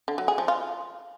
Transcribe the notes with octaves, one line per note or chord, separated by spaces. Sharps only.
D3
F#3
G#4
F3
F4